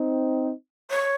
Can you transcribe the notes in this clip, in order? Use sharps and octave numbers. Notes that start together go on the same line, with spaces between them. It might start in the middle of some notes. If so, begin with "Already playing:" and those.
Already playing: C4 D#4
C#5